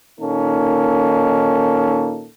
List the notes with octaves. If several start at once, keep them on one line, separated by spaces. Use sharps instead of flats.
A#2 D#3 A#3 C#4 D#4 A4